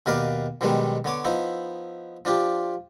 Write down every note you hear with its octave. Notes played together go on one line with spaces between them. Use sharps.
D#2 B2 A#4 B4 D5 F5
B1 B2 D#3 G3 G#3 B3
D3 B3 C#5 D6
F3 B3 D#4 E4
F3 D4 F4 G4